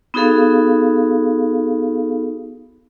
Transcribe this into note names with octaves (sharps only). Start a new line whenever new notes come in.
B3 D#4 F#4 G#4 A4 F5